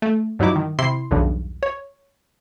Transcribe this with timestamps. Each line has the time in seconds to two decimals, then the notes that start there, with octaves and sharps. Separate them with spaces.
0.02 A3
0.39 G2 F#3 D#4 E4 D6
0.56 D#3
0.79 C3 E4 C6 C7
1.11 B1 E2 G2 C#3
1.63 C#5